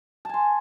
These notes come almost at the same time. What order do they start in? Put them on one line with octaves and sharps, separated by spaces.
A5 G#5 C6